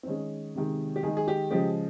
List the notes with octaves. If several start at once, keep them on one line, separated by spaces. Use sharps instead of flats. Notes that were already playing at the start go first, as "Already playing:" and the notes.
C4
D#3 G#3 C#4
C3 D#3 G#3
G4
D#3 G#3 G#4
G#4
G4
C#3 F3 G#3 G4